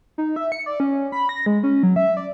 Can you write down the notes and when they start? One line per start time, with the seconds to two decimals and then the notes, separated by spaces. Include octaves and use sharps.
0.18 D#4
0.36 E5
0.52 C#7
0.66 D5
0.80 C#4
1.12 B5
1.29 A#6
1.46 G#3
1.63 C#4
1.83 F#3
1.96 E5
2.17 D5